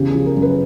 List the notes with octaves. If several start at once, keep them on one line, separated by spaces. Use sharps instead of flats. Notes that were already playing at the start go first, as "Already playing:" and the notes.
Already playing: E2 C#3 G4
F3 G#4
A#4
F#2
B4